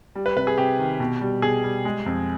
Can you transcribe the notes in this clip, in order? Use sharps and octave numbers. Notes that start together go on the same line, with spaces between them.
G3
B4
C3 B4
G#4
C3 G4
D#3
B2
G3
B2 G#4
G3
G#3
F2